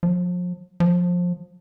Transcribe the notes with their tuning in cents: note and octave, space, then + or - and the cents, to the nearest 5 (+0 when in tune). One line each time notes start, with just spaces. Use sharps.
F3 +35
F3 +20